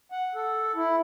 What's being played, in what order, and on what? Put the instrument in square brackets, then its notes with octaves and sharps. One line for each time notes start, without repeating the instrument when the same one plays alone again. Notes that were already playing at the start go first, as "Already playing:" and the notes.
[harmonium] F#5
A4
E4